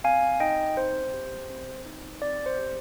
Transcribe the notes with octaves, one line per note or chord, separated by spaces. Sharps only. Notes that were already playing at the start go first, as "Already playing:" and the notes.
C4 F5 G#5
D#4 D#5 G5
C4 C5
G4
C4
D#4
C4 D5
C5
G4